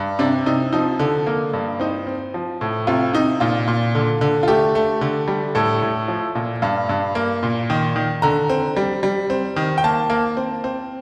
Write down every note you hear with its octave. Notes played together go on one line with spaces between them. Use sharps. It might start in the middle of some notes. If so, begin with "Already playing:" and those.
Already playing: G2
C3 D4
C3 D#4
F3 D#4
D3
A#3
G2
C4 D#4
C4
F3
A2
C3 F4
C3 D#4
A#2 F4
A#2
D3
D3
F4
A3 G4
A3
D3
G3
A2 A4
A2
F3
A#2
G2 F5
G2
A#3
A#2
D#3
D#3
D3 A#5
C4
G3
G3
C4
D#3
G5
A#3 A5
A#3
C4
C4